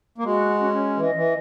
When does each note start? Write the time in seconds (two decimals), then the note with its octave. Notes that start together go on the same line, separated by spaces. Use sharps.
0.18 A#3
0.24 G#3 F#4
0.60 C#4
0.97 E3 D#5
1.15 E3